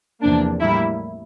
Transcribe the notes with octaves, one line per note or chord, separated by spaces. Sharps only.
E2 C3 F3 A#3 D4
A2 G3 A#3 E4